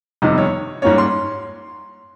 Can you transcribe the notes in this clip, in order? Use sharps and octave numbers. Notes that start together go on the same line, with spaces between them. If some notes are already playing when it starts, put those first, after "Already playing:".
G1 F2 C3 D#3 G3 D#5
C#5
G#2 G3 A#3 C#4 C#5
C6